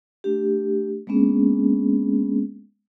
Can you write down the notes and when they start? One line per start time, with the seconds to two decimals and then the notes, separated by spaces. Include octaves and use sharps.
0.24 A3 D4 G4
1.07 G#3 A#3 B3 C#4 D4 G#4